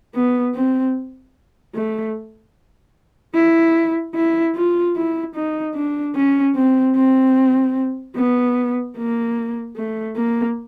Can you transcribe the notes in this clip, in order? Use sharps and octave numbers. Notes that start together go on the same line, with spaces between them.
B3
C4
A3
E4
E4
F4
E4
D#4
D4
C#4
C4
C4
B3
A#3
A3
A#3